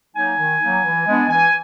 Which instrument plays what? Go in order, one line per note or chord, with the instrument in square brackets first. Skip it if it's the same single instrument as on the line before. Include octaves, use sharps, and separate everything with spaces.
[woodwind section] F#3 A#3 D#4 G#5
D#3
F#3 A#3 D#4
E3
G#3 B3 D4
E3 G#5